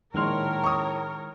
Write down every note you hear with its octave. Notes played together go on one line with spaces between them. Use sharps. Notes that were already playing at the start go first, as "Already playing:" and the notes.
A#1 A2 D#3 G#3 A#4 C#5 C6 F6
C#6 D#6